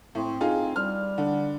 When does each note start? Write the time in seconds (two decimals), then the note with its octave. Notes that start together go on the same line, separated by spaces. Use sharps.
0.15 A2 C4
0.41 D#4 F4 G#4
0.76 G3 F6
1.18 D3